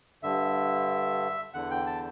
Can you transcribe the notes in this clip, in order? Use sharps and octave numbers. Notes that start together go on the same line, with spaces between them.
G2 D3 E5
E2 D3 F#5
G5
A5